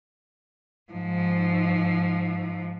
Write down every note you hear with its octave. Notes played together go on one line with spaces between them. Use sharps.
G#2 F3